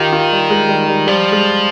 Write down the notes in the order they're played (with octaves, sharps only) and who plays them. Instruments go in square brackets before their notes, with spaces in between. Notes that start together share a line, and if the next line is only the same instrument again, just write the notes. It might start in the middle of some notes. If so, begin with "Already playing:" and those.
Already playing: [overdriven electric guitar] D#3 [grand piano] D#4 F4 G4
[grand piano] F4
G3
G#3
G3
G3
[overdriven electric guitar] F3 [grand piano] G3
[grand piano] G#3